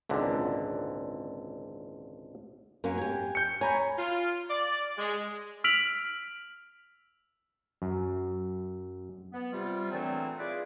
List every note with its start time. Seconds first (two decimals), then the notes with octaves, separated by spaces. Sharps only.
0.09 G#1 C#2 A#2 D3
2.84 F#2 A#3 C#4
2.98 G4 G#5
3.35 G6 C#7
3.61 C#5 G#5 A#5 B5
3.97 F4
4.48 D5
4.98 G#3
5.64 E6 F6 B6 D7 F7 F#7
7.82 F#2
9.33 B3
9.52 C3 G3 F4
9.91 A#2 D3 E3 F#3 A3 C4
10.39 E4 F4 G#4 B4 D5